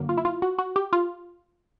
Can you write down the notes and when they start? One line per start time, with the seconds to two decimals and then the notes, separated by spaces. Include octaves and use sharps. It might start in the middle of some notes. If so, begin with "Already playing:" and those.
Already playing: F#2 D3 F#3 A#3
0.09 F4
0.18 E4
0.25 F4
0.42 F#4
0.58 F#4
0.76 G4
0.93 F4